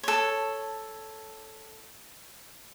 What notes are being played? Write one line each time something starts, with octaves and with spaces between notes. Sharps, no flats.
A4 C#5